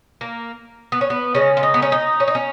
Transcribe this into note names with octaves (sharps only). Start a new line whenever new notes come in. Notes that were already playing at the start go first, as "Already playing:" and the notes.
A#3
B3
C#4
B3
C#3 G#3 C#4
F4
D#4
B3
C#4
D#4
C#4
D#4
C#4